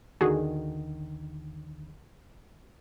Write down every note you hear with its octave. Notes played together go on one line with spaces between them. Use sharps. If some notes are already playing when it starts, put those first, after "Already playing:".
D#2 D3 D#3 F#4 G#4